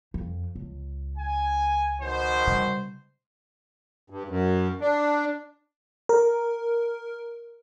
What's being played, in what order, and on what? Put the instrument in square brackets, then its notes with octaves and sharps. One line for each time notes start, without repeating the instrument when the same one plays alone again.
[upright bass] F2
C#2
[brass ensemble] G#5
B2 D#3 C5
[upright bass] C#3 G3
[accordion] G2
F#2
D4
[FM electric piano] A#4